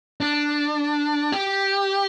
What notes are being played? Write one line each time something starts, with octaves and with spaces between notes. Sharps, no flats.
D4
G4